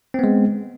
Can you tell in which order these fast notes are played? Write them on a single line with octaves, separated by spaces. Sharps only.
C4 B3 G#3